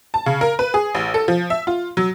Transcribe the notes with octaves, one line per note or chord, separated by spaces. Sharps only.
A5
C#3
A#4
B4
G#4
A1
A4
F3
E5
F4
F#3